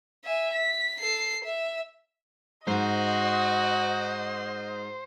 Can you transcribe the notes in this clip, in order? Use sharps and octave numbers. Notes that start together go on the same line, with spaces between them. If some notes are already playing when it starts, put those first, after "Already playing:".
E5 G#5
B6
A4 C7
E5
G#2 F#4 C5 D#5